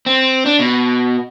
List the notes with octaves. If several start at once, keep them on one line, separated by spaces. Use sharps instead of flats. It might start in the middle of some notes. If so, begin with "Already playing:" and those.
C4
D4
B2